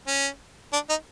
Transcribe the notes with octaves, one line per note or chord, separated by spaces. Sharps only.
C#4
D4
D#4